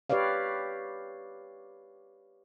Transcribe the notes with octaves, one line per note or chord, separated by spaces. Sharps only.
G4 B4 C#5 D5 F5